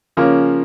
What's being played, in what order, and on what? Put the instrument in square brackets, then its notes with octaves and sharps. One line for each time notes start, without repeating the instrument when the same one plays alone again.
[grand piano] C#3 F3 A#3 C#4